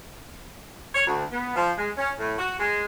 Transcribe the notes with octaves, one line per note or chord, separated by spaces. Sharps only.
C#5
D2
B3
F3
G#3
C#4
A2
F#4
G#3